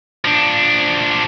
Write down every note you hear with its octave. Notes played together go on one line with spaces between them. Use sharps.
F3 D4